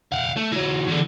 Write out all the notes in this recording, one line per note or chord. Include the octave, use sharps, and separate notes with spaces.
F5 F#5
A3
E3 F#3
E2 D3